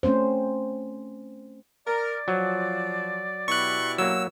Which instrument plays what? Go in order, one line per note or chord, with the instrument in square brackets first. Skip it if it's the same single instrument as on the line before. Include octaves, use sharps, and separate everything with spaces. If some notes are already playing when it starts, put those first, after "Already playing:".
[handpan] A3 C4 C#4 C5
[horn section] A#4 [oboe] D5
[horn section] F3 [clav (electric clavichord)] F#3
[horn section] B2 E4 G4 [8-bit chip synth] C#6 F#6
[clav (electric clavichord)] F#3 A#3 [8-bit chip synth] E6